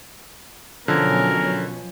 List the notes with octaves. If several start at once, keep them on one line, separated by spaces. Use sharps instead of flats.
B2 D3 F3 F#3 C#4 A#4 G#6